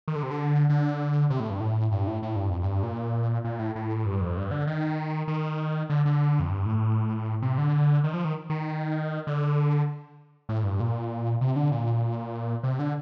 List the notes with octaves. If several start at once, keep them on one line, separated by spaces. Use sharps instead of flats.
D#3
D3
C3
D3
D3
C3
A2
G2
A2
G2
A2
A2
G2
F2
G2
A#2
A#2
A2
A2
G2
F2
G2
D3
D#3
D#3
D3
D3
F2
G2
A2
C3
D3
D#3
F3
D#3
D#3
D3
A2
G2
A#2
C3
D3
A#2
C3
D3